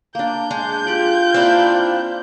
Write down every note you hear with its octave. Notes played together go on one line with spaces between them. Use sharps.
A#3 D4 G6
G#3 D4
F4 G4 D5
A#3 C4 D4 E4